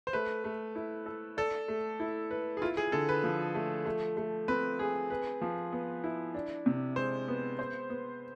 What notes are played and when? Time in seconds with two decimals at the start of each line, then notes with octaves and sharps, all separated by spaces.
0.07 C5
0.13 A3 B4
0.44 A3
0.75 E4
1.06 A4
1.37 A4 D5
1.68 A3
2.00 E4
2.31 B4
2.57 G#4
2.61 E4 F4
2.77 G#4
2.92 D3 A4
3.09 B4
3.24 F3
3.55 A3
3.86 A3
4.17 A3
4.48 C4 B4
4.79 G#4
5.10 B4
5.41 F3
5.72 B3
6.04 E4
6.34 D4
6.66 C3
6.96 G#3 C5
7.28 B3
7.59 C5
7.90 B3